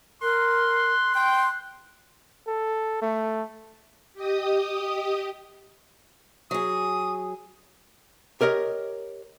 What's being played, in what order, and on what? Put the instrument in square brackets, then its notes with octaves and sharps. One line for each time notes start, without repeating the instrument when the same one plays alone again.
[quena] A#4 [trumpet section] C6 [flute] F#6
[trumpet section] G5 [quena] C6
[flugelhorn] A4
A3
[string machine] G4 D#5 D#6
[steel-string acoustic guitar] F#3 G#4 [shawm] D#6
[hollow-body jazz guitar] G4 A#4 C#5 D#5